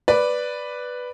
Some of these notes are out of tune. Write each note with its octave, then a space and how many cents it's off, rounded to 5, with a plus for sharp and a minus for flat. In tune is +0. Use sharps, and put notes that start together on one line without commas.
B4 +0 D5 +0